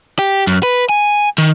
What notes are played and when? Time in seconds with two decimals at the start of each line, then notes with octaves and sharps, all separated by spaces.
0.19 G4
0.47 F#2
0.63 B4
0.89 G#5
1.38 D#3